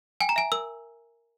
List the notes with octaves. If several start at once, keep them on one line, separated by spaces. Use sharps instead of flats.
G5 G#5
A#5
E5 G#5
A#4 E6